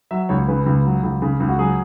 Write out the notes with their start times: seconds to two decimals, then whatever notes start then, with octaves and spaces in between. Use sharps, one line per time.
0.11 F#3 E5
0.29 C#2 C#5
0.48 C#3 B4
0.66 C#2
0.85 F#3
1.03 C#2
1.22 C#3
1.40 C#2
1.48 F#4
1.58 F#3 G#4